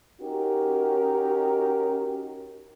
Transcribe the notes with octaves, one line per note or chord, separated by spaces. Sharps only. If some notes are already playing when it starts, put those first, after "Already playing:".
C#4 D#4 F#4 G4 A#4